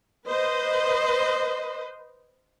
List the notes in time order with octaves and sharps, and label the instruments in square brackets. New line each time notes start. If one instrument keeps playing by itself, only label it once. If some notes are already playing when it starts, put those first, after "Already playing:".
[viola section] B4 C5 D#5